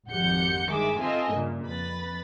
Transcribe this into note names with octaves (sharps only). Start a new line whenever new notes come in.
G#1 F2 G4 F#5 G6 C#7
G1 D#3 G#3 G#4 E5 D6
C4 F4 A4 D#5 E5 G#5
G2 A#2 C#3
F2 B4 B5 A6